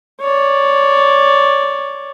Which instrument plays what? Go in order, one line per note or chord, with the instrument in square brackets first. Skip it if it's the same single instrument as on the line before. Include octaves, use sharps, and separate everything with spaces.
[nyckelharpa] C#5 D5